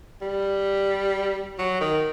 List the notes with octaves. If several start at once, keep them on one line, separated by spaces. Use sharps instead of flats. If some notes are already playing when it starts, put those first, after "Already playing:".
G3
F#3
D#3